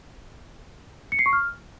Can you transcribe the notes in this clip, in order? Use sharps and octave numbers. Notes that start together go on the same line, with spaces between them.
C#7
C7
C#6
F6